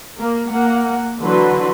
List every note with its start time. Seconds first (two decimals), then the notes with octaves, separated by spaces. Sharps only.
0.19 A#3
0.51 A#3 F#5
1.21 D3 E3 F#3 F#4 B4 C6